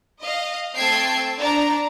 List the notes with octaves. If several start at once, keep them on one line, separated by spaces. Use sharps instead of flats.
D#5 F5
A3 C4 G5 A5 G#6 C7
D4 A#5